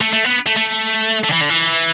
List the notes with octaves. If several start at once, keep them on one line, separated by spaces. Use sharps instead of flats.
A3
A3
B3
A3
A3
A3
D3
E3
D3
E3